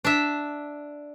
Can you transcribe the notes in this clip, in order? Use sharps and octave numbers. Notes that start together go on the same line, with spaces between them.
D4 E5